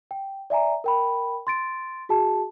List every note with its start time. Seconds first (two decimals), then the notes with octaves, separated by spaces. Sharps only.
0.11 G5
0.50 D5 E5 G#5 A#5
0.84 A#4 G5 B5
1.47 C6 A6 D7
2.09 F#4 G#4 A5